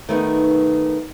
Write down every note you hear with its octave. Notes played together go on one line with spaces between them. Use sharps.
D#3 A3 B3 D#4